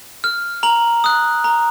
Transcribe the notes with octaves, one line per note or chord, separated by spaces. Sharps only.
F6
A#5 F#7
D#6 F#6
A#5